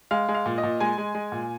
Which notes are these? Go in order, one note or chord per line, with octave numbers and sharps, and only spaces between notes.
G#3 F5
G#3
F5
A#2
D#5
A#2
G#3 G#5
G#3
G#3
A#2